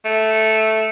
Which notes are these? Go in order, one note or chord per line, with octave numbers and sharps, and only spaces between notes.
A3